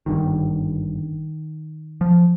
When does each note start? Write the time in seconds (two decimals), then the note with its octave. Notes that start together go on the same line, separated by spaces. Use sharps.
0.06 G#1 G2 D3 D#3
2.01 F3